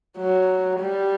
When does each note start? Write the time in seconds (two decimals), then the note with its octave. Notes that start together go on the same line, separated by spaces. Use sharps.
0.18 F#3
0.79 G3